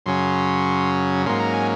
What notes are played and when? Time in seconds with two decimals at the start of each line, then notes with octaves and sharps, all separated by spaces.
0.06 F#2 C#3 F#3 C#4 C6
1.26 G#2 F#3 A#3 C#4 C6
1.39 A#5
1.54 G#5